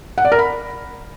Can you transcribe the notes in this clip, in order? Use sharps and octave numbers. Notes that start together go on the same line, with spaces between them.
F#5
D5
A#4
B5